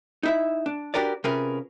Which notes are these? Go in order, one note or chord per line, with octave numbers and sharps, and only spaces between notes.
D#4 E4 E5
D4
D4 F#4 G4 A#4 B4 D5
C3 C#4 F4 G#4 A#4 B4